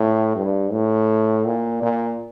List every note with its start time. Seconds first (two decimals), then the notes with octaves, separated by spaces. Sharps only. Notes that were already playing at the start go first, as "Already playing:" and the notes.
Already playing: A2
0.36 G2
0.72 A2
1.45 A#2
1.82 A#2